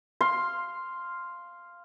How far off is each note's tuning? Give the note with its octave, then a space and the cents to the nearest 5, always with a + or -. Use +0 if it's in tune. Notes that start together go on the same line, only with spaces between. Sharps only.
F5 -5 C6 +0